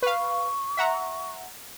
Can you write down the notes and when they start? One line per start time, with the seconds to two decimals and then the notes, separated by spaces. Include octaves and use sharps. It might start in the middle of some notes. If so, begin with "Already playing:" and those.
0.03 B4 F5 C#6
0.77 E5 F#5 A#5